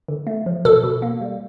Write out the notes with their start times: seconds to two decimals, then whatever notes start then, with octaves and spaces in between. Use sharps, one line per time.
0.08 D3
0.27 A3
0.46 F3
0.65 B2 A4
0.83 B2
1.02 A#3
1.21 G3